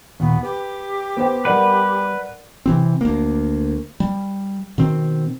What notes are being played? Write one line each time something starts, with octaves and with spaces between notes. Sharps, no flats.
D#2 A#2 B3
G4 B4
B3 C5 G5
G3 B3 A#4 B4 D5 F#5
C3 E3 C4
D2 A#3
G3
B2 D#3 C4